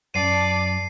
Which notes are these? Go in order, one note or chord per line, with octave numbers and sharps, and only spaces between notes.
F#2 D5 A5 C7 D#7